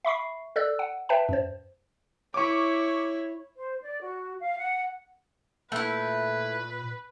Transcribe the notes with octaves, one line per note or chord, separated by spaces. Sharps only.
E5 B5 C#6 C7
A4 D5 E6 F#6
F#5
B4 E5 G5 A5
F#2 C5
E4 C#5 C#6 D6
C5
D5
F#4
F5
F#5
A#2 A3 E4 B4